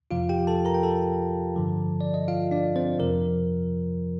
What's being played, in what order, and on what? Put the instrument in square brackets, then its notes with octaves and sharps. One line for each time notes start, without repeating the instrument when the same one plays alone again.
[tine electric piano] F2 C3 F3 F4 F5
G4 G5
A4 A5
A#4 A#5
G5
A4 A5
G2 D3 F3
D5
D#5
F4 F5
D4 D5
C4 C5
F2 C3 F3 A#4